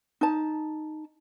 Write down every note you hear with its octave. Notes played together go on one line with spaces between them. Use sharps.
D#4 A5